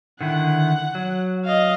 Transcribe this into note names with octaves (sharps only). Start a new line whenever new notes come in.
D3 D#3 E4 F#5
F#3
D#5 F5